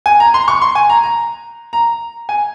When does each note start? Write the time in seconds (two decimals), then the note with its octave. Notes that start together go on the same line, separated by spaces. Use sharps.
0.06 G#5
0.20 A#5
0.34 C6
0.48 C#6
0.61 C6
0.75 G#5
0.90 A#5
1.03 A#5
1.73 A#5
2.29 G#5